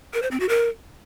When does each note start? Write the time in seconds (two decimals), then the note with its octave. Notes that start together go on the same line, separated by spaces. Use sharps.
0.14 A#4
0.22 C5
0.31 C4
0.40 F#4
0.49 A#4